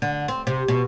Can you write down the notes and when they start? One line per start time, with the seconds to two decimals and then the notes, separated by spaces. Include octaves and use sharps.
0.02 D3
0.28 C4
0.47 C3
0.68 B2